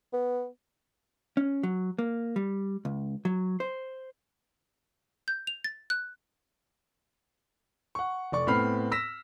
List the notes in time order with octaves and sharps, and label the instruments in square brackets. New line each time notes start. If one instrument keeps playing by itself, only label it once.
[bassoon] B3
[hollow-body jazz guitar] C#4
F#3
A#3
G3
C#2
F#3
C5
[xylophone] G6
F7
A6
F#6
[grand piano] F#5 C#6
F1 D5 C#6
A2 B3 C4 B5 F6 C7
E6 A#6 B6 E7